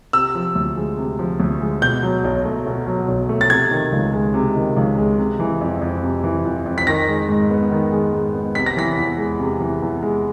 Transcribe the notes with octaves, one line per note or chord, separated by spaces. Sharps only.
C3 E6
F3
D2
G#3
C3
F3
D2
G#3
B2 G6
F#3
B1
A3
B2
F#3
B1
A3
A6
C3 G#6
D#3
C#2
G#3
C3
D#3
C#2
G#3
C3
E3
F2
F2
C3
E3
F2
F2
B6
D#3 A#6
G#3
G#2
B3
D#3
G#3
G#2
B3
C3 B6
A#6
E3 B6
E2
G#3
C3
E3
E2
G#3